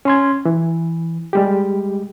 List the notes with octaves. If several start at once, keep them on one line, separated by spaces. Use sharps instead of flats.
C#4 C6 G#6
E3
G3 G#3 G4